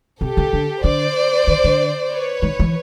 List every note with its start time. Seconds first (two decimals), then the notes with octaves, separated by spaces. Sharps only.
0.21 C3 G4 A4
0.37 C#3
0.53 D3
0.84 D3 C5 D5
1.47 D#3
1.64 D3
2.12 B4 C#5
2.42 D#3
2.59 E3